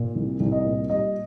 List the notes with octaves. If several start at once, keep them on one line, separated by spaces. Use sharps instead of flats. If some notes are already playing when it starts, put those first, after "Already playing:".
Already playing: A#2
C2
C2
D#5
A#2
G3 D#5